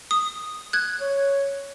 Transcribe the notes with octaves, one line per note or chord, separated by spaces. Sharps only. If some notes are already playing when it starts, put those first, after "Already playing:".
D#6
F#6 G#6
C#5